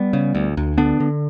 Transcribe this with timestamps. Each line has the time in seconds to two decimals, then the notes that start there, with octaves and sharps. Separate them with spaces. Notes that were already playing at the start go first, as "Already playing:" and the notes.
Already playing: G3 B3
0.13 C#3
0.35 D2
0.57 D2
0.78 D3 B3 D4
1.00 D3